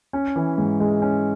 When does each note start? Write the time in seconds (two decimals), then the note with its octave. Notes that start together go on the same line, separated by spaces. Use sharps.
0.13 C#4
0.36 E3
0.58 G#2
0.80 G#3
1.02 C#4